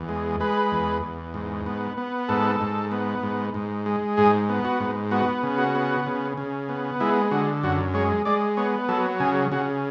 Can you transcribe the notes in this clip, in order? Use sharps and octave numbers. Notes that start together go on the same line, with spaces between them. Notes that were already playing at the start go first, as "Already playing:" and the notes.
Already playing: E2
G#3
G#3 B4
E2
E2
G#2
B3
B3
G#2 A4
G#2
B3
G#2
G#2
G#3
G#2 G#4
B3
F#4
G#2
B3 F#4
C#3
F#4
B3
C#3
C#3
B3
G#3 E4
D3 F#4
F#2 F#4
G#3 C#5
G#3 D5
B3 C#5
F#3 A4
C#3 G#4
C#3 F#4